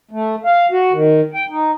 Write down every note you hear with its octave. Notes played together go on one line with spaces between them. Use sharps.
A3
F5
F#4
D#3
G5
D#4